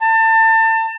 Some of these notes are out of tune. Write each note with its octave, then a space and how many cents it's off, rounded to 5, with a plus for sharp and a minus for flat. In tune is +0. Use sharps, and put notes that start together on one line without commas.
A5 +30